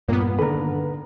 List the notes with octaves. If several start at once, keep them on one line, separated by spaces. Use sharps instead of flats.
G2 A#2 A#3 B3
D3 D#3 A4 B4 A#5